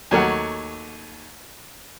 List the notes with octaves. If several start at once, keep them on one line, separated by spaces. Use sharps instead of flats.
D#2 F#3 A3 F#5